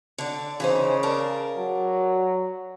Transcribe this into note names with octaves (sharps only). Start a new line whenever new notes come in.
D3 D5
C#3 E3 D#4 C5
A#4 D5 A5
F#3